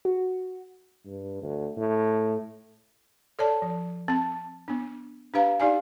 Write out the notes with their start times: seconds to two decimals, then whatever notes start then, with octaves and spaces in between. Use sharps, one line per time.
0.05 F#4
1.06 G2
1.42 D2
1.77 A2
3.39 A4 C#5 D5 A5
3.62 F3
4.08 C4 A5
4.68 B3 D4
5.34 D4 G4 B4 F5 A#5
5.60 D#4 G4 D5 F5 G#5